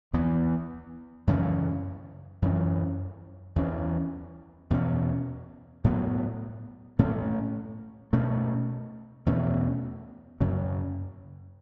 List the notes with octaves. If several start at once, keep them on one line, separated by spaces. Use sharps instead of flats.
E2 E3 B3
F#2 C#3 E3 C#4
F#2 E3 C#4
E2 E3 C#4
E2 B2 A3 C#4
A2 F#3 B3
A2 A3 C#4
B2 A3 C#4
E2 B2 A3 C#4
F#2 C#3 F#3 C#4